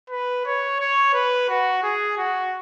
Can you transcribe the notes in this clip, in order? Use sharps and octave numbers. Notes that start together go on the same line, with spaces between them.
B4
C#5
C#5
B4
F#4
G#4
F#4